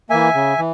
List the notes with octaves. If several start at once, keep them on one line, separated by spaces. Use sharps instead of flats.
E3 A#3 E5 G#5
C#3
E3